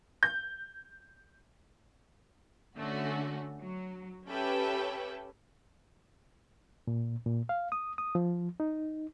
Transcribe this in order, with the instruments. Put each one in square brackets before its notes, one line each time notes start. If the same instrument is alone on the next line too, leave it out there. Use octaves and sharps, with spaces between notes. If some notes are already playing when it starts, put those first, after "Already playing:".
[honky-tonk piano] G6
[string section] D3 A3 C#4 F#4
F#3
C#4 G4 A4 B4 E5 G5
[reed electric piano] A#2
A#2
F5
D#6
D#6
F3
D#4